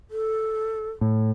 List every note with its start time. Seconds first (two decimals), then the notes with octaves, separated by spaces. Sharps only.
0.11 A4
1.01 A2